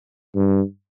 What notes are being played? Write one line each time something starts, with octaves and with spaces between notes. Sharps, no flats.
G2